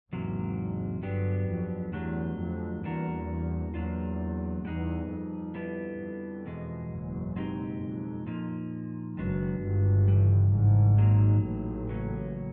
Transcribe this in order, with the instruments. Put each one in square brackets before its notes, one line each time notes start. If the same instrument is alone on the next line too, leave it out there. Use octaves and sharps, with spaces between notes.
[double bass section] G#1 G#2 [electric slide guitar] E2 C3 F#3 A#3
[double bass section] G1 G2 [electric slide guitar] F#3 B3 D4 G4
[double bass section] F2
[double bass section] E2 [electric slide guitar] D3 F#3 A3 D4 G4
[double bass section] F2
[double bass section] E2 [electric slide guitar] G3 A#3 D4 F#4 A#4
[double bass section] E2 [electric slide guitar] F#3 A#3 D4 F4
[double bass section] E2 [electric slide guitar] G3 B3 D#4 G#4
[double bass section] F2
[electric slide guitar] D3 G3 B3 E4 G4
[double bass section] F2
[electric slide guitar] E2 B2 G#3
[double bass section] F#1 F#2
[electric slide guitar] B2 G#3 C4 D#4 G4
[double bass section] F2
[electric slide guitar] A#2 F3 A#3 D#4
[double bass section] F#1 F#2 [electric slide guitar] D#3 G#3 B3 D4 F#4
[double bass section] G1 G2
[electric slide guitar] C#3 E3 G3
[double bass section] G#1 G#2
[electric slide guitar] A#2 F#3 A#3 D#4 G#4
[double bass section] A1 A2
[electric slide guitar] C#3 F#3 A#3 C#4